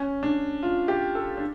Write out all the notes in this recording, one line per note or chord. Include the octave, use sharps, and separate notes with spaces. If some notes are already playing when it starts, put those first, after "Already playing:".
Already playing: C#4
D4
F4
G4
A4
D4